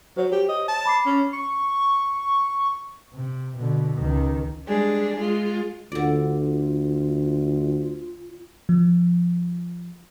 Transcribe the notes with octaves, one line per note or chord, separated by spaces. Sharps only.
F#3 C5 C#5
G4
D#5
A5
B5 D6 C7
C#4
C#6
C3
B2 D3
C#2 D#3
G3 G#3 D4 G#4
G#3 F4
D2 D3 F4 D5
F3